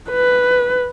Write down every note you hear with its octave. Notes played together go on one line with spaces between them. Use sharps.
B4